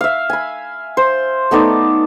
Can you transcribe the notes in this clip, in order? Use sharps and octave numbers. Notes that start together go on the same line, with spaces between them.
E5 F5
G#5 B5
C5
A3 B3 D#4 D5